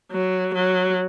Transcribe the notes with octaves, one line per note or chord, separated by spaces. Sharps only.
F#3
F#3